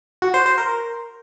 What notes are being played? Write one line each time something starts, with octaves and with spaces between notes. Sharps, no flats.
F#4
C5
C5
A#4